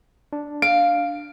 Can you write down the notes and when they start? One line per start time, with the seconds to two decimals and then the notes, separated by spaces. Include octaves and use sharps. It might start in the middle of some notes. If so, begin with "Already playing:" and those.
0.33 D4
0.62 F5 D7